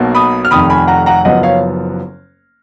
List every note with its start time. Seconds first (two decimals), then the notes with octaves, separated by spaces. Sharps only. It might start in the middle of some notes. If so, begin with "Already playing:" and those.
Already playing: B1 B2 A#3
0.15 B5 D#6
0.45 F6
0.51 F1 F2 D#3 B5 D#6
0.70 G#5 B5
0.88 F#5 A#5
1.06 F#5 A#5
1.25 F#1 F#2 F3 B3 D#5 F#5
1.43 C#5 F5